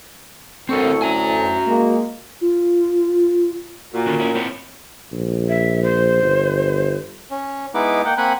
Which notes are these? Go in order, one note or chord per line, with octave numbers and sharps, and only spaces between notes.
D2 A2 C4 A4 A#4 C#6
C#4 F#4 E5 G#5 A#5
G#3 A#3
F4
A#2 F#4 A#4
D3 D#3 C#4
C#4 E4
C4 E4 C#5
A#1
E5
C5
G1
C#4
G#3 B3 D#4 E4 B4 D6
A#3 F#5 G5
A#3 C4 F#5 G#5 B5 F#6